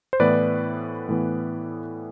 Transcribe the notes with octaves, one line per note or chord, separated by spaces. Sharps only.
C5
A2 E3 B3 B4 D5
A2 E3 B3